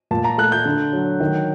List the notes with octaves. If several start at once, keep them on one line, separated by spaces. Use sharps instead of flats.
A#2 A5
A#5
A3 F#6
G6
D3
F#3
D#3